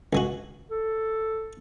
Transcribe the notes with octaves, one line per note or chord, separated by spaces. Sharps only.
C#2 G#3 F#4
A4